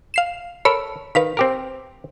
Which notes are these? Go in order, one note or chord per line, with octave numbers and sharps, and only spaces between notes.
F5 C7 E7
A4 A#4 C#5 B5
D#3 B4 F5 B6
C4 G4 A#4